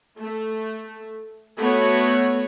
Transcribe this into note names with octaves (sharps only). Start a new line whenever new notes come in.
A3
A3 B3 F#4 C#5